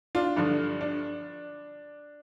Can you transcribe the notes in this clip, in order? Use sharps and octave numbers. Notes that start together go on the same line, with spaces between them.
D4 F4
G2 D3 F3 D4
D4